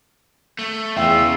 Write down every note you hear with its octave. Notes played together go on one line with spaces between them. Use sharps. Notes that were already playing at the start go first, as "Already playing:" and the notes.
A3
E2 C#3 F4 E5 G5 E6